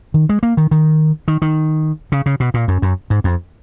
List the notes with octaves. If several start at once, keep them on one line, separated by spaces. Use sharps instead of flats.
D#3
G#3
A#3
D#3
D#3
D#3
D#3
C#3
C#3
B2
A#2
F#2
F#2
G#2
F2